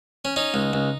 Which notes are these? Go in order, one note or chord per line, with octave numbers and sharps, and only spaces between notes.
C#4
C#4 D#4
C#2
C#2